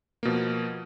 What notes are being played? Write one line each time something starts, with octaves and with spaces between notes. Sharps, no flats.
B2 F3 A#3